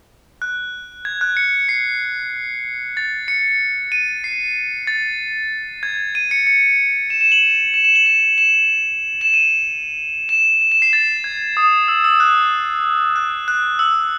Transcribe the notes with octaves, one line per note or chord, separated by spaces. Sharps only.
F#6
G#6
F#6
C#7
C7
A6
C#7
D#7
C7
A6
G#6
D#7
C#7
C#7
E7
E7
F#7
E7
E7
E7
F#7
E7
E7
E7
D#7
E7
E7
E7
C7
A6
G#6
D#6
E6
E6
F#6
F#6
F#6
E6